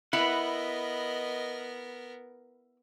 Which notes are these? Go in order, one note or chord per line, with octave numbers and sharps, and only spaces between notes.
B3 E4 A#4 B4 D#5 F#5